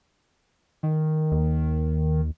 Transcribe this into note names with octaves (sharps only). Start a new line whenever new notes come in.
D#3
D#2